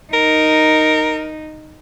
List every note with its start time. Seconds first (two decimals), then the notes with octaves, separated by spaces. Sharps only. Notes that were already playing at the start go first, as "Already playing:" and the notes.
0.14 D#4 A#4